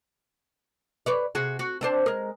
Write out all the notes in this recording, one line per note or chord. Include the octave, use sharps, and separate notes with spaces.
B4 C#5 D5
C3 F#4 G#4
F#4
C4 D4 C5
G#3 A#4